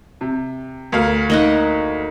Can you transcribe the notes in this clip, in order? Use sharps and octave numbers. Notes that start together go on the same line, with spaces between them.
C3
D2 A#4 F5
A#3 D#4 F#5